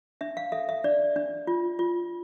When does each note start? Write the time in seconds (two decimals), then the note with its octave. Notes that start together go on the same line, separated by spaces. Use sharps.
0.21 D4 E5
0.37 F5
0.52 A4 E5
0.69 E5
0.84 D4 D5
1.16 D4
1.47 F4
1.79 F4